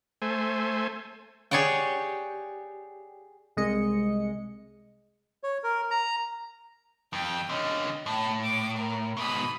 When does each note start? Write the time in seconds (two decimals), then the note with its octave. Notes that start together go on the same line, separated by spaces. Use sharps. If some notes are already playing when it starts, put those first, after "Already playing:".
0.22 A3 C5 G#5
1.51 G4 G#4 C#5 D5 F#5 G5
3.57 C2 G#3 D#5 C#7
5.44 C#5
5.64 A#4
5.91 A#5
7.13 F2 G5
7.49 D3 C#4 D#5
8.06 A2 A5
8.43 D6
8.77 A#4
9.17 G#2 B2 B5 D#6